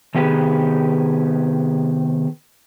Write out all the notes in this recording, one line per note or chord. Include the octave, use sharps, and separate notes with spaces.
C3 D#3 B3 G4 G#4 B4